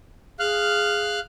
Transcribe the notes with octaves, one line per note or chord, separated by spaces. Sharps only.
G#4 F5 F6 F#6